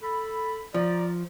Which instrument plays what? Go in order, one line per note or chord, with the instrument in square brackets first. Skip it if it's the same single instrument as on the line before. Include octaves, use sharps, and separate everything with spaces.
[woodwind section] A4 B5
[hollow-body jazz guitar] F3 [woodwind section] D5 A#5